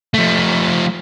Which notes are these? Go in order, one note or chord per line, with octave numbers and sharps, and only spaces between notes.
F3 A3